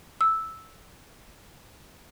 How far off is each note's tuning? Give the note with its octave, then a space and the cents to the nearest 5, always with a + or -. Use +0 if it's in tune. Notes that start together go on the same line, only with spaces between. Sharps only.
E6 -5